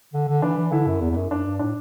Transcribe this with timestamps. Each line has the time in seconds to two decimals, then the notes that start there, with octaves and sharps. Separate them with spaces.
0.14 D3
0.28 D3
0.42 E3 D4
0.57 E3
0.72 D3 E4
0.87 F#2
1.01 E2
1.11 E2
1.16 F#2
1.30 F#2 D4
1.45 G2
1.59 A2 D4